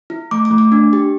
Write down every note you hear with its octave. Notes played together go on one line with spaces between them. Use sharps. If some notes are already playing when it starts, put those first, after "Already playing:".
E4
A3 D6
D6
A3
D6
D4
G4